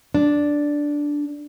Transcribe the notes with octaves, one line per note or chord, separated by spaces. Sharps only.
D4